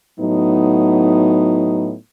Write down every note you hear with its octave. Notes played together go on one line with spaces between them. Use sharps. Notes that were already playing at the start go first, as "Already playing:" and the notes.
A2 F#3 B3 D#4